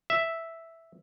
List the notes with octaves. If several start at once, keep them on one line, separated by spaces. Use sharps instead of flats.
E5